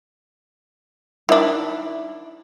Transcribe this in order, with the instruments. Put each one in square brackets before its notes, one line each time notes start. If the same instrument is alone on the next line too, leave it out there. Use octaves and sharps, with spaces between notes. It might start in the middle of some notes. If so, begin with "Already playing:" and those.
[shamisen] D#3 D4 [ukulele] E4 E5